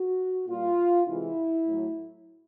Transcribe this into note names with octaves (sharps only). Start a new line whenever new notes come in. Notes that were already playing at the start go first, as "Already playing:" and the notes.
Already playing: F#4
A#2 G3 F4
C3 E3 G#3 E4
A2 F#3